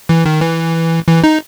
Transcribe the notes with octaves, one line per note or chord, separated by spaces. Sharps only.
E3
D#3
E3
E3
D#4